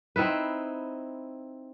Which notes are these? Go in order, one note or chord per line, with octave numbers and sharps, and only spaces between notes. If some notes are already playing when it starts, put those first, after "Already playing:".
C4 D#4 E4 B4